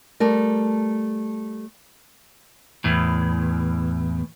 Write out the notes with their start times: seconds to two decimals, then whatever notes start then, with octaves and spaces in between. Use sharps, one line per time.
0.20 G3 A3 A#4
2.84 E2 A2